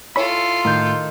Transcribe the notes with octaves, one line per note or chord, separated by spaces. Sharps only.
E4 F4 A4 C#5 B5
A2 D#3 G6